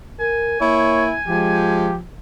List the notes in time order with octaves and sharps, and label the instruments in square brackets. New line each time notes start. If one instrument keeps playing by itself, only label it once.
[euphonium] A#4 [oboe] G#5
[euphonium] A#3 [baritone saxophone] E4 [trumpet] C#5
[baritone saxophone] F3 [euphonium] G#3 [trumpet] G4